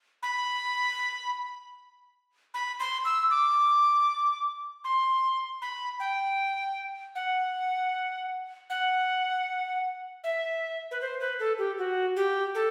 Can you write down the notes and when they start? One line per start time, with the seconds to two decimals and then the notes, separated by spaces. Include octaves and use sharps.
0.23 B5
2.54 B5
2.80 C6
3.05 E6
3.31 D6
4.84 C6
5.62 B5
6.00 G5
7.15 F#5
8.70 F#5
10.24 E5
10.91 B4
11.01 C5
11.20 B4
11.39 A4
11.58 G4
11.78 F#4
12.16 G4
12.55 A4